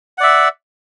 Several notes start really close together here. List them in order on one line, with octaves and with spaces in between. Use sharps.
F#5 D5 E5